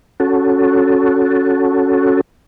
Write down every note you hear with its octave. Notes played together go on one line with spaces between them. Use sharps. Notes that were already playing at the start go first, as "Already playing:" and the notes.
C#4 F#4 A4